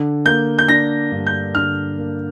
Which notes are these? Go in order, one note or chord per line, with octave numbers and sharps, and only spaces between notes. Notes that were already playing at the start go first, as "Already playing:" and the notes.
Already playing: D3
A#3 G6
G6
D4 A#6
G2
G6
D3 F6
A#3